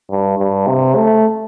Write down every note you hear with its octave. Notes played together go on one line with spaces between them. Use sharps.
G2
G2
C3
A3